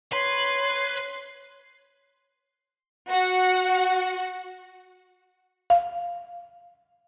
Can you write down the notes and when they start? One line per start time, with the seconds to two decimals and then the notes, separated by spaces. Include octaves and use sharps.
0.12 B4 C#5 C6
3.08 F#4 F#5
5.70 F5